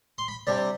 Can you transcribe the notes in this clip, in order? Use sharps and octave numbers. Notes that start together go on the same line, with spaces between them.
C6
B5
C3 G3 D4 D5